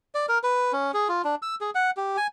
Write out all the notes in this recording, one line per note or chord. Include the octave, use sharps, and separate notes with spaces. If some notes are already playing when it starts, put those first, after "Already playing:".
D5
A#4
B4
C#4
G#4
F4
D4
E6
G#4
F#5
G4
G#5